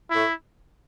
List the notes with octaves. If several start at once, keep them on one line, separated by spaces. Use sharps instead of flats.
A2 A3 E4